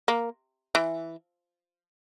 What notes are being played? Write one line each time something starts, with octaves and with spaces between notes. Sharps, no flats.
A#3
E3